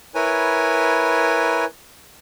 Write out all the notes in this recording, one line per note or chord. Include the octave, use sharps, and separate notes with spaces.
E4 A#4 B4 C#5 G#5